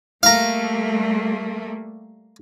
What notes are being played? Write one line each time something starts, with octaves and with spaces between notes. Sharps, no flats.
G3 A3 A#3 F5 A#5